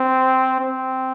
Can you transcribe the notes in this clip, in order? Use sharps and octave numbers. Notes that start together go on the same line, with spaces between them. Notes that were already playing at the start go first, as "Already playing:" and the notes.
Already playing: C4
C4